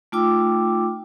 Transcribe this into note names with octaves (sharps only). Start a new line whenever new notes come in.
A3 D#4 F4 G5 D6 E6